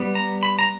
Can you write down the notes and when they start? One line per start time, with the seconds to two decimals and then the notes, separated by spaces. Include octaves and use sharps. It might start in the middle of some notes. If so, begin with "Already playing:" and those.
Already playing: G3 B3
0.15 A#5
0.43 B5
0.59 A#5